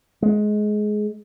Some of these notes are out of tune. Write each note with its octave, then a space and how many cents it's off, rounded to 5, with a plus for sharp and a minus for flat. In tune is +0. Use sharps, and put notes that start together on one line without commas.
G#3 +20